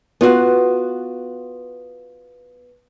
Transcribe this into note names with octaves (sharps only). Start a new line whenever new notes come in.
B3 F4 F#4